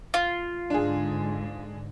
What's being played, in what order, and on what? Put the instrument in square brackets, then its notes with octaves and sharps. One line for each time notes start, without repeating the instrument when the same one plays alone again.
[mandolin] F4
[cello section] G#2 D3 [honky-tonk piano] D4 G#4